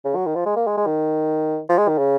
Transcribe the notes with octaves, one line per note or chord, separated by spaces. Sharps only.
C#3
F#3
D#3
F3
G#3
A#3
G#3
G#3
D#3
F3
G#3
D#3
C#3